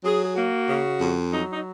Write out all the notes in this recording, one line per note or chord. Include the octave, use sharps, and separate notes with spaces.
F#3 G#4
G#4
A#3 F#4
C#3
F2
F#3 D#4
D#4